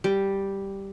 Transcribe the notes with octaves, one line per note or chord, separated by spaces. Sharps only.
G3